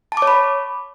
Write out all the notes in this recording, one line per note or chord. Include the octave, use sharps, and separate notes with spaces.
A5
D6
C#5
B5